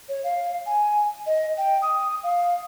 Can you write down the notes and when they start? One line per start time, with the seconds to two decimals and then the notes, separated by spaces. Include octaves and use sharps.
0.09 C#5
0.24 F5
0.66 G#5
1.26 D#5
1.58 G5
1.82 D#6
2.23 F5